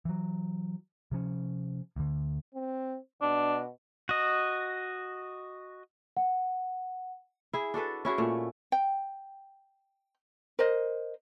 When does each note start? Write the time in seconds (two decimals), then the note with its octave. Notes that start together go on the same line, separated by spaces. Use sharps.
0.05 E3 F#3
1.11 C3 F3 C#4
1.96 D2 D3
2.54 C4
3.22 B2 D4
4.09 F#4 D#5
6.17 F#5
7.53 E4 G#4
7.74 D4 F#4 A4 B4
8.05 C#4 E4 F#4 G#4
8.18 A#2 A3
8.72 G5
10.59 A#4 C5 D#5